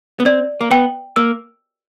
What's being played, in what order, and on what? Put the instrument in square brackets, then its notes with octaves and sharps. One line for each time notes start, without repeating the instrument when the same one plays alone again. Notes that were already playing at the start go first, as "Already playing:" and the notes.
[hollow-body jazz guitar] B3
[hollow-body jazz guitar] C4 [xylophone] D5
[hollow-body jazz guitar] A#3
[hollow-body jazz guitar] B3 [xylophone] G5
[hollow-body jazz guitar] A#3 [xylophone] E6